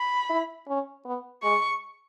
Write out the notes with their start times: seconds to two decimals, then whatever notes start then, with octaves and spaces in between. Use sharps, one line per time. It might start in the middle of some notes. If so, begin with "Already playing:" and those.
Already playing: B5
0.30 E4
0.68 C#4
1.05 B3
1.43 G#3 C#6